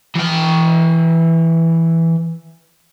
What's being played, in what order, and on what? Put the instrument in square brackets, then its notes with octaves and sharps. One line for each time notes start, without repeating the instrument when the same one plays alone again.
[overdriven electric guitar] E3 G5